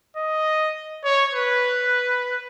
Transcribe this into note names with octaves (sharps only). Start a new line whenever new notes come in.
D#5
C#5
B4